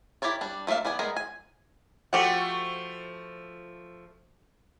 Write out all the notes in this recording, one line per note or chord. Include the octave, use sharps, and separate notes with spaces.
E4 G4 A#4 C#5 D5
G3 D4
D#3 A3 A#3 E5 F5
E3 B3 D5 G#5
G#3 A3 B3 G#4 A#4
G#5
F3 A3 F#4 G4 F#5